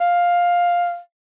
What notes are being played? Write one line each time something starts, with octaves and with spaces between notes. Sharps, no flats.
F5